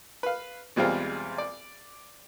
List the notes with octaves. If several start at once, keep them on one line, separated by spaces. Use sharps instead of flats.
B4 F5
B1 E2 G3 G#3 C4 F4
D5